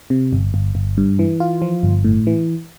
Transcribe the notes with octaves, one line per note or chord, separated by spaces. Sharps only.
C3
G1
G1
G1
G2
E3
F4
F3
G1
A2
E3